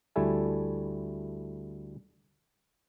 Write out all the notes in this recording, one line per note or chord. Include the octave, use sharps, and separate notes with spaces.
D2 G3 A3 E4 A4 G#5